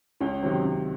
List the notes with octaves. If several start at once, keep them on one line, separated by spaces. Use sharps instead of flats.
C#2 C#4
C3 D#3 F#3 C4
C#2